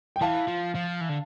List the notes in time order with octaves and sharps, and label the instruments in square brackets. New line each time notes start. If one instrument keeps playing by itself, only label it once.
[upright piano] G5
[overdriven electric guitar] E3 [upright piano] F5 A5
[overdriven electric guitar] F3
F3
E3
D3